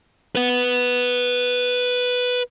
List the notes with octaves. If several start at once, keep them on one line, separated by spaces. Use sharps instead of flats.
B4 F#5